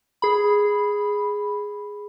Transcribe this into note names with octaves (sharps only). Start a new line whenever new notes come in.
G#4 B5